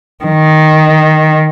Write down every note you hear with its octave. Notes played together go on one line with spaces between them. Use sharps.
D#3